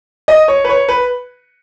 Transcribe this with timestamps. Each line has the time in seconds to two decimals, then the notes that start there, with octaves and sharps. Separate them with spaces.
0.28 D#5
0.48 C#5
0.64 B4
0.69 C#5
0.88 B4